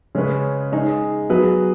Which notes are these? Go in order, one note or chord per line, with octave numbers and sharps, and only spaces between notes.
C#3 G#3 C#4 B4
G#3 D#4 G#4
F#3 B3 G#4 B4